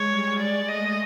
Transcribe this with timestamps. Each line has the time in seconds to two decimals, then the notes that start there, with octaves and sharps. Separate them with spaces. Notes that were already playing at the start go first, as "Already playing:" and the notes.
Already playing: G#3 C#5
0.10 G3
0.39 G#3 D5
0.68 A3 D#5